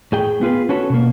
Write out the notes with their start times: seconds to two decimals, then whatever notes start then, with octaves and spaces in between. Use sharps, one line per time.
0.12 A2 G#4 G5
0.41 B3 F4 G#4 B4
0.69 C#4 F#4 A4 B4 C#5
0.90 B2 A#3